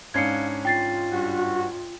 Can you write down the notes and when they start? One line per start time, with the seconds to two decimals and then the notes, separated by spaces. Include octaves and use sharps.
0.14 G#2 C#4 D4 F5 G#6 C7 C#7
0.65 F4 G5 A6 C7
1.11 G2 F#4